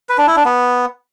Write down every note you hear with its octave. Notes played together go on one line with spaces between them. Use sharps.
B4
D4
E4
D4
B3